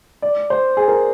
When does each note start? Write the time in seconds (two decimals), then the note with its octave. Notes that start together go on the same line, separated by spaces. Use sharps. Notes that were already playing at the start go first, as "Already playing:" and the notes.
0.22 D5
0.50 C5
0.77 G#4
0.88 A#4